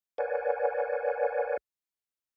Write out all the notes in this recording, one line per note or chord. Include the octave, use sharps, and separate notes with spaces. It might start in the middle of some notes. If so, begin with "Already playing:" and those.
A#4 B4 C#5 D5 F#5 G#5